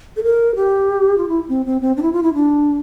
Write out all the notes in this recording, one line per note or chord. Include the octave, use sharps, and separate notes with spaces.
A4
A#4
G4
F4
E4
C4
C4
C4
D4
E4
F4
E4
D4